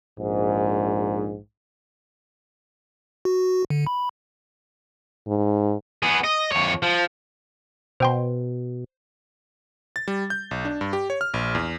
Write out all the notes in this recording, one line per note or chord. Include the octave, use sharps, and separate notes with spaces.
A#1 G#2
F#4
D3
B5
G#2
B3 G#4
D#5
F2 C#5
F3
B2 C5 G5 C6
A6
G3
G6
B1
D4
G2
G4
C#5
F6
A#1
E2